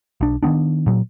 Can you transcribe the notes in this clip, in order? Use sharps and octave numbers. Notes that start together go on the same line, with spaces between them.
B1 D4
D#3 F#3 B3 D4
A#2 F#3